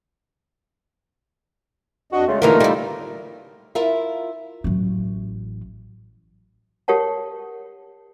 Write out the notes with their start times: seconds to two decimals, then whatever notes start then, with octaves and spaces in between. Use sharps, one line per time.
2.13 F2 D4 F#4 D#5
2.28 C#3 G#3 A3 F4
2.42 C2 D3 E3 A3 A#3 D#4 F4 A#4
2.60 G3 E4
3.75 E4 F4 A#4 E5
4.64 A1 F#3
6.88 G4 A#4 C#5 F#5 A5